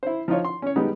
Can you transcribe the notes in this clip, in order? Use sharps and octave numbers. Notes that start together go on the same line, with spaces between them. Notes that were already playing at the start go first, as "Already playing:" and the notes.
E4 C5
F3 D#4 F4 C#5
C6
C#4 C#5
G3 G#3 B3 D#4 G4